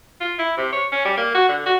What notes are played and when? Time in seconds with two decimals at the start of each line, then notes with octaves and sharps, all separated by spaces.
0.20 F4
0.39 E4
0.57 C3
0.73 C#5
0.92 C#4
1.05 G3
1.17 A#3
1.34 F#4
1.48 D3
1.66 F#4